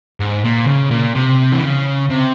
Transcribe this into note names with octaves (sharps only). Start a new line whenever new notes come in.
G#2
A#2
C#3
A#2
C3
E3
C#3
C3